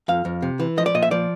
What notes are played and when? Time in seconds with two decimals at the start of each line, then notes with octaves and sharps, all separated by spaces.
0.08 F2 F5
0.25 F2
0.42 C3
0.60 E3
0.77 F3 D#5
0.86 D5
0.95 A#2 D#5
1.03 E5
1.11 F3 D5